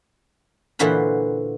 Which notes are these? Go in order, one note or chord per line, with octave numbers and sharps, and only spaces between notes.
A#2 D3 E3 F#4 C5 B5